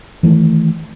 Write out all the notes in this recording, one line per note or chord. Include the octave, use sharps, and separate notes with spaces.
D#3 E3 A3